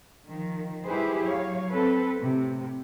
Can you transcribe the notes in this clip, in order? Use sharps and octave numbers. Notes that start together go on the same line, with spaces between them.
D#3 F3
G3 E4 G4 G#4 B4 C5
F#3 C#5 F5
C4 A4 B4
A2 C3